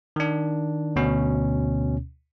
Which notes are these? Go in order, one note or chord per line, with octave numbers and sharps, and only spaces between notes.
D#3 D4
D2 B2 C#4